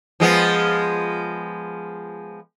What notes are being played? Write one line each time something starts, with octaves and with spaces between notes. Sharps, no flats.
F3 G#3 B3